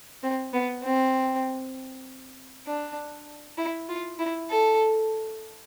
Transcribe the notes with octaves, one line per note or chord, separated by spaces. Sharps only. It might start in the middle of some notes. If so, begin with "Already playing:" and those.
C4
B3
C4
D4
E4
F4
E4
A4